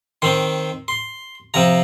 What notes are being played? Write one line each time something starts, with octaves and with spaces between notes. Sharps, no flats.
D#3 C4 C6
C6
C3 F3 C4 A#5